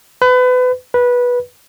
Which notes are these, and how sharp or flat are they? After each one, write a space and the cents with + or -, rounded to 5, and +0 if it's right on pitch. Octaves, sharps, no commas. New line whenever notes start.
B4 +30
B4 -15